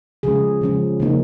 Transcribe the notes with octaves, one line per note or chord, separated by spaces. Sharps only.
C#3 F3 G#3 C#4 G#4
C#3 F3 G#3 C#4
C#3 F3 A#3 D#4